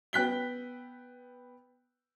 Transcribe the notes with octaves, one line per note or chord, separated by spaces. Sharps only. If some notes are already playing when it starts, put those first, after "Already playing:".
B3 G5 F#6 B6 G7